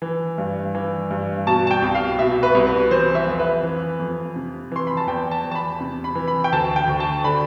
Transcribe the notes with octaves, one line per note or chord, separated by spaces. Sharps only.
E3
G2
E3
G2
B2 A5
A5
G5
C2
F5
B2 E5
B4
C2
B4
E3 C5
E5
F2
B4
E3
F2
C3
E3 C6
B5
A5
E2 G5
A5
E2
A5
B5
C3
B5
E3
B5
G5
D2 A5
G5
D2
A5
D3 B5